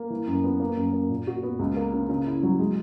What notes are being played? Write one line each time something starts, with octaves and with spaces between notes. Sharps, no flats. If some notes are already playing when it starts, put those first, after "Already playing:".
Already playing: A#3
E3
F#2
B3
A#3
F#2
A#3
A#2
F#4
B3
C#2
A#3
C#3
C#3
E4
F#3
G#3